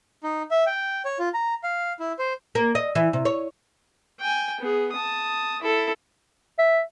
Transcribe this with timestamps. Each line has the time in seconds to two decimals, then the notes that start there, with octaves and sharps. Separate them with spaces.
0.23 D#4
0.51 E5
0.66 G5
1.05 C#5
1.19 F4
1.34 A#5
1.63 F5
2.00 E4
2.19 C5
2.55 A#3
2.75 D#5
2.95 E3
3.13 C3
3.25 C#5
4.20 G5 G#5
4.60 B3 G#4
4.92 A5 D#6
5.62 E4 A4
6.59 E5